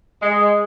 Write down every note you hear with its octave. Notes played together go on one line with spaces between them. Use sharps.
G#3